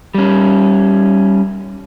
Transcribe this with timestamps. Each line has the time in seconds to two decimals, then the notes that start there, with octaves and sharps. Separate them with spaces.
0.14 G3 C#4